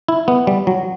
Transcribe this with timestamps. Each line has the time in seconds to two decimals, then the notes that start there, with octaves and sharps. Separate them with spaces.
0.08 E4
0.28 B3
0.47 G3
0.67 F#3